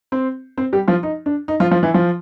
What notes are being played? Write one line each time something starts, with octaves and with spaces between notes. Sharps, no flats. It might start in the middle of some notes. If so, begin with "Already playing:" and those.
C4 C5
C4 C5
G3 G4
F3 F4
D#4
D4
D#4
F3 F4
F3 F4
E3 E4
F3 F4